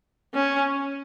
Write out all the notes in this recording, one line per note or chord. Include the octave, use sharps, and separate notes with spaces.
C#4